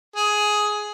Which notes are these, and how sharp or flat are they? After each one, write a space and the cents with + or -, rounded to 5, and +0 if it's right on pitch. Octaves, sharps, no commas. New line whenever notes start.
G#4 +10